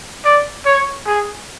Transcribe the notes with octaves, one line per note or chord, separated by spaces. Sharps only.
D5
C#5
G#4